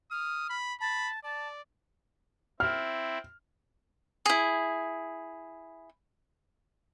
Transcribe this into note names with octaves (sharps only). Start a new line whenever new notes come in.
D#6 F6
B5
A5 B5
D5 A5
C4 E4 F6
E4 G#4